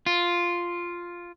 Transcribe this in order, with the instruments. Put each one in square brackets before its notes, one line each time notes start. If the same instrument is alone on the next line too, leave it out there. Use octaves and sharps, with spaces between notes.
[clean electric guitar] F4